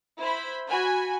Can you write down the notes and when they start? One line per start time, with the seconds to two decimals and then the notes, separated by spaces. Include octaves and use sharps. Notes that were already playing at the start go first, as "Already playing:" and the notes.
0.20 E4 C5 B5
0.66 F#4 G#5 B5